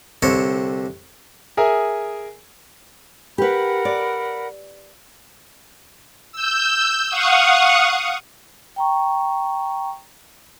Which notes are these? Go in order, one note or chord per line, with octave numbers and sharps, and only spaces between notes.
C2 D3 C4 C#5 A5
G#4 A#4 E5 G#5
G4 A#4 B4 F#5 B5
D5
E6 G6
F5 F#5 C#6 D#6
G5 A#5 C#6